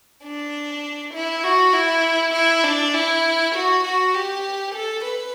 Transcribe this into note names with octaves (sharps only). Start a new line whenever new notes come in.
D4
E4
F#4
E4
E4
D4
E4
F#4
F#4
G4
A4
B4